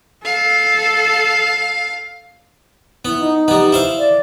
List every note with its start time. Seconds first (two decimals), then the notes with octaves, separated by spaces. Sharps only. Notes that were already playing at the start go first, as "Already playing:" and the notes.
0.25 A4 F5
3.05 B3 E4
3.20 D#4
3.48 G3 B3
3.72 E4 C5 F5
3.99 D5